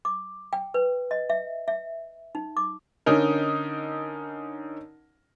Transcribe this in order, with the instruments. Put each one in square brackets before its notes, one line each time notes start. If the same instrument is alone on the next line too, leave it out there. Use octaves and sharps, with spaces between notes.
[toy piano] D6
G5
B4
D#5
E5
E5
D#4
D6
[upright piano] D3 C#4 D#4 A#4